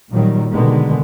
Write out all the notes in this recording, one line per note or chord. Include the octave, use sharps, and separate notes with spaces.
A#2 D#3 F#3 G3
B2 D3 D#3 G#3 B3